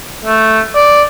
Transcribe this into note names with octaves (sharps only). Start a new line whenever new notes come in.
A3
D5